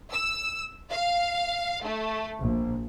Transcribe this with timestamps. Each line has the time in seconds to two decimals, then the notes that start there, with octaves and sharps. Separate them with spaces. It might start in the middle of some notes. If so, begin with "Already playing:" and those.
0.12 E6
0.90 F5
1.82 A3
2.39 A#1